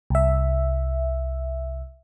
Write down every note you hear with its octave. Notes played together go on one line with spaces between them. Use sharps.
C2 E5